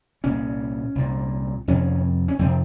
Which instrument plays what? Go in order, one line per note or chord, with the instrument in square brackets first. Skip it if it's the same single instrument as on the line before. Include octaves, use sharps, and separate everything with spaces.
[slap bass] C2 A#2 C#4
C2 A#2
F2 C3 C#4
C#4
F2 C3 C4